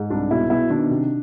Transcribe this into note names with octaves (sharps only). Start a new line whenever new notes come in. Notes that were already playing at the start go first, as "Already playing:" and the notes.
Already playing: G#2
C2 D4
B2 E4
B2 E4
D#3 D4
C3